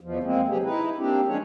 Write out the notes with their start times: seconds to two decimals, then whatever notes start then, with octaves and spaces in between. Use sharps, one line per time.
0.01 E2 B2 F3
0.24 G#3 A#3 C4
0.48 C3 E3 F#3 G4 G#4
0.63 D#4 E4 B4
0.98 G3 A#3 C4 D4 G4
1.27 F3 G#3 C#4 D4 G#4 C#5